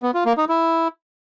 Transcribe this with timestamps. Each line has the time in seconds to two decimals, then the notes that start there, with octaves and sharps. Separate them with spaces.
0.03 B3
0.14 F4
0.26 A#3
0.37 D#4
0.49 E4